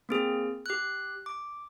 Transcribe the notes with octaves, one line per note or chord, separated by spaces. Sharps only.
A#3 C4 G#4
G4 F#6
D6